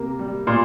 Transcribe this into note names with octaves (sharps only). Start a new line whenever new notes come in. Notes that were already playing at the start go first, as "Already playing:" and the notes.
Already playing: C3 A#3
G3
A#2 C6